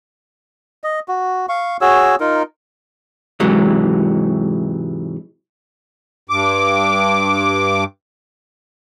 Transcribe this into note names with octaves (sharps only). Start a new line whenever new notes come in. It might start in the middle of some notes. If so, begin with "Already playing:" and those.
D#5
F#4
F5 C#6
F#4 G#4 C#5 E6
D#4 F4 A#4
G#2 C3 E3 F#3 G#3
G2 D6